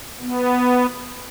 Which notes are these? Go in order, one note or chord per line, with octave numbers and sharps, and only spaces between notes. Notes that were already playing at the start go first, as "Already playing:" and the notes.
B3